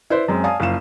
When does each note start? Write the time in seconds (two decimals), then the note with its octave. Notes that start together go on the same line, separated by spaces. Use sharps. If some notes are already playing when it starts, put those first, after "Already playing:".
0.10 E4 B4 C5 D5
0.28 F#2 G#3 C4
0.44 D5 F5 G#5 A5 D#6
0.60 F#1 F3 F5 E7